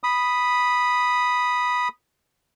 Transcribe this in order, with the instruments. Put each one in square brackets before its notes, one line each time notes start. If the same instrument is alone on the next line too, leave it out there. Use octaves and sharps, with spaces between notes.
[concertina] B5 D#6